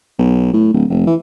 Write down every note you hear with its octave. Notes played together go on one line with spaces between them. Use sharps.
B1
A2
D1
F1
E3